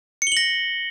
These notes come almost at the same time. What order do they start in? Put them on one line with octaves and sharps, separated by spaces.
C#7 G7 F#7 A#6